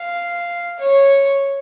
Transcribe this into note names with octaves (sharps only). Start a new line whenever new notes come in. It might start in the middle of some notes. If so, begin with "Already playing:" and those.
Already playing: F5
C#5